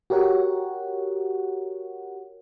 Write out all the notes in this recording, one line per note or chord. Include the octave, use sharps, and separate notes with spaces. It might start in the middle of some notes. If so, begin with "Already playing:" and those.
F#4 G4 A#4 C#5 F#5